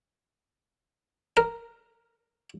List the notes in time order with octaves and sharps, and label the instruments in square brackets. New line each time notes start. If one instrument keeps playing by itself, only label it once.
[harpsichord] A#4